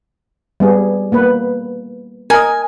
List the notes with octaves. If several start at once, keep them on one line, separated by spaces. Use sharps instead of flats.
G3 B3 G#4
A#3 B3 B4
A#4 D#5 G#5